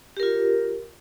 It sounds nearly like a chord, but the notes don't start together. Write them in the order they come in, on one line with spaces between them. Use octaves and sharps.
G4 A#4 F4